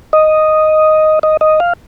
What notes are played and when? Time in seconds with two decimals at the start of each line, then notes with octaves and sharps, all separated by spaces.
0.13 D#5
1.23 D#5
1.41 D#5
1.60 F5